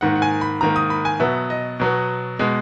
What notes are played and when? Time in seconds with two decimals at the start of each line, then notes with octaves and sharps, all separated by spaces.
0.01 G#2 D#3 A#3 F#5
0.16 F#5
0.22 G#5
0.41 B5
0.61 G#2 D#3 A#3 A#5
0.76 D#6
0.90 B5
1.05 G#5
1.20 B2 F#3 B3 E5
1.50 D#5
1.80 B2 F#3 B3
2.39 B2 G#3 B3